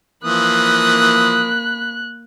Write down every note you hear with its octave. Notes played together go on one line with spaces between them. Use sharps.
E3 F3 A#3 B5 D#6 F#6